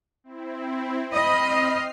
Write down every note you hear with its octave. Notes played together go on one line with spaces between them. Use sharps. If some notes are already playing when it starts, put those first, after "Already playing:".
C4 E4
C4 D#5 B5 F6 C7